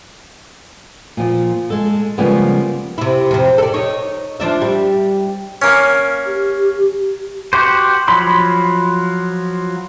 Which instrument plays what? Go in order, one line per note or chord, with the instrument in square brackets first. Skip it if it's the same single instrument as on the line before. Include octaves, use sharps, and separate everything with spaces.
[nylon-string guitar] A#2 F3
G#3 A4
C#3 F3 G3 G#3 A#3 B3
[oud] C3 E4
F2 C3
A4 D5
D#4 C#5
F3 D4 E5
G3
[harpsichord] A#3 C#4
[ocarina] G4
[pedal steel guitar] F#4 G4 C5
F3 F#3 B5 C6